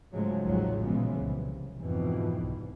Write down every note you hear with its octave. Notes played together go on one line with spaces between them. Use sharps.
G#2 C#3 F3 F#3 G#3 A3
A1 D#2 G#2 F3 F#3 G#3
A#2 C#3 E3 F3 G#3 B3
C2
F2 G#2 B2 D#3 E3
C2